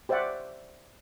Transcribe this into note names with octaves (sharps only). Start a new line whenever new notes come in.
G4 C5 D5 E5 F#5